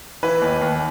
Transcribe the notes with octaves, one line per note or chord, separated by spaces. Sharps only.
E3 B4
D#2
D#2